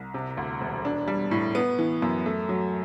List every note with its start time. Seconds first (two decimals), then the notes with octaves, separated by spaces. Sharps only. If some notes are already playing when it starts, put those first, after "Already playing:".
Already playing: C2
0.14 C3
0.37 D2
0.61 E1
0.85 D4
1.08 G3
1.31 A2
1.55 B3
1.79 E3
2.02 F#2
2.26 A3
2.49 F#3